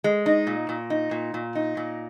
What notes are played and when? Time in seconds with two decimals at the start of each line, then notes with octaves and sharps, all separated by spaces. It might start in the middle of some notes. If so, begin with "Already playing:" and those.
0.04 G#3
0.26 D#4
0.47 A#2
0.69 A#2
0.90 D#4
1.11 A#2
1.34 A#2
1.55 D#4
1.77 A#2